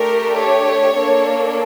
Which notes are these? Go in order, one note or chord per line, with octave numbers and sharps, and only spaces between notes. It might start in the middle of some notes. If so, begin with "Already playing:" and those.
Already playing: A3 D4 G4 A#4
C#5
A#3 D4 A4